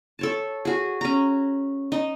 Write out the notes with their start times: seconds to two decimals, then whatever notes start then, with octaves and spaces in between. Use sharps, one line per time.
0.19 A4 C#5 A5
0.65 F#4 G#4
1.01 C#4 A#5
1.92 D#4